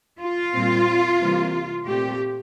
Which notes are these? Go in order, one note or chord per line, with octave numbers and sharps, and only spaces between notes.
F4
A#2 G3 C4
C3 E3 G3 A#3
A#2 A3 C4 G4